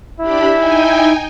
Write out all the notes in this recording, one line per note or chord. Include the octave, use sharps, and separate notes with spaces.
D4 E4 G4 B5
D#4 G5 G#5